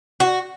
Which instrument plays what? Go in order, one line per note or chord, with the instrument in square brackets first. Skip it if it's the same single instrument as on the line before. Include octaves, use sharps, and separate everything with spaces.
[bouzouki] F#4